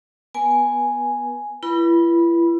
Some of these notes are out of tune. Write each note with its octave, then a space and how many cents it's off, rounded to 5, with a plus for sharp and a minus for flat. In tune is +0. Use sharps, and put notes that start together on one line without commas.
B3 +0 B4 -45 G#5 +0
E4 +40 B4 -35 B5 -10